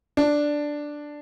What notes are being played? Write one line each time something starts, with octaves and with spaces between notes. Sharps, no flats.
D4